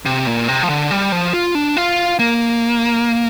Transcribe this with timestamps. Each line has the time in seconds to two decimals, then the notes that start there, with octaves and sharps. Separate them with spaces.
0.06 C3
0.27 A#2
0.48 C3
0.63 F3
0.69 D3
0.91 G3
1.12 F3
1.33 F4
1.55 D4
1.77 F4
2.19 A#3